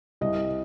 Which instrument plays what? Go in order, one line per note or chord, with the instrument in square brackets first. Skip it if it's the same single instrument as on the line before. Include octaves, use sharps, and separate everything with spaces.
[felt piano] C2 D#5